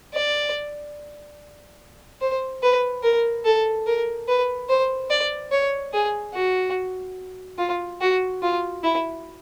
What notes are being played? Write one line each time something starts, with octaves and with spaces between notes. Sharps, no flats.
D5
C5
B4
A#4
A4
A#4
B4
C5
D5
C#5
G#4
F#4
F4
F#4
F4
E4